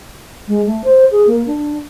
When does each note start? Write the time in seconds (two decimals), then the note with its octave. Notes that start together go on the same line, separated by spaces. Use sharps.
0.47 G#3
0.65 A3
0.84 C5
1.11 G#4
1.27 A#3
1.46 D4